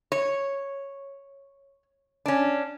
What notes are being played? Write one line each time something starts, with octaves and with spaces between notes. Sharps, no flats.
C#5
C#4 D4